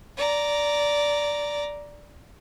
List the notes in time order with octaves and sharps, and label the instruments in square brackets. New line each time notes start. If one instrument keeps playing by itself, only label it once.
[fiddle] D5 A#5